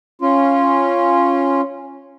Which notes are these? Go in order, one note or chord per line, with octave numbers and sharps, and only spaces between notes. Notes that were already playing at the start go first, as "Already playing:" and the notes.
C#4 F4